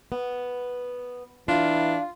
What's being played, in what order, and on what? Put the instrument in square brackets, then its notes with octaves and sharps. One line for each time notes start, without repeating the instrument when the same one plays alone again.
[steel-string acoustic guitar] B3
[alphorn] E3 [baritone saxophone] D4 [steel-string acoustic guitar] F4 [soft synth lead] F5